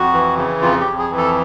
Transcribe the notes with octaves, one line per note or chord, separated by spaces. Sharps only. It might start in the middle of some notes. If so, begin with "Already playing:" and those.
Already playing: F2 F#4
E3
C#3
F2 F4
G4
F2
G#4
E3
A4